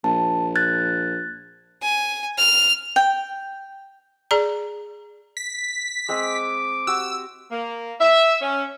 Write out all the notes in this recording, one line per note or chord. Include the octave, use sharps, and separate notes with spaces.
A#1 A5
F#6 G#6 A6
G#5
F6
G5
G#4 D5 A#5
B6
G#3 C4 D6
F#4 G4 E6
A#3
E5
C#4